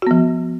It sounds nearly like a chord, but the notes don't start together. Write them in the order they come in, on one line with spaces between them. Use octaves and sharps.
F#4 B3 F3